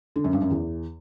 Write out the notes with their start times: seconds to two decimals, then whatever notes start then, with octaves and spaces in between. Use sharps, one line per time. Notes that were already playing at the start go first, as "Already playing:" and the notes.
0.16 D3
0.24 F#2
0.33 G2
0.42 F#2
0.51 E2